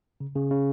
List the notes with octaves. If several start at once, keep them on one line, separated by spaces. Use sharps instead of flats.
C#3
C#3
C#3